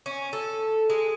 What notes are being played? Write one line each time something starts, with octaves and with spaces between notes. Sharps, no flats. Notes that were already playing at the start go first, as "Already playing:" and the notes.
C#4
A4
G#3